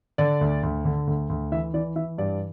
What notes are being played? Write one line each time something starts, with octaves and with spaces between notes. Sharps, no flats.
D3 D5
D2
D2
D3
D2
D2
E3 E5
E3 D5
E3 E5
G2 D5